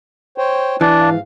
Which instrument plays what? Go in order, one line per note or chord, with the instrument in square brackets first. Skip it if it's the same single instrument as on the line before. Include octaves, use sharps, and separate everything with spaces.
[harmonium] C5 C#5 G5
[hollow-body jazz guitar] E3 [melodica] D4
[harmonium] G#2 F5